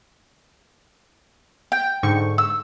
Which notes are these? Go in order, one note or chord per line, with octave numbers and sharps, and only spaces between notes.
G5
G#2 D3 C#6
E6